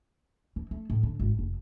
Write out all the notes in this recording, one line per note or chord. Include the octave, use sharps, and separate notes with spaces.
E3
A3
A2
D3
G#1
F1